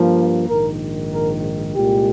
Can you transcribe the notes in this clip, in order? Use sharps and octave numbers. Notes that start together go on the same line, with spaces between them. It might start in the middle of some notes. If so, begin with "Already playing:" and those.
Already playing: G2 F3 A#3
A#1 G#2 D#3 A#4
A#4
C2 A#2 G#3 G4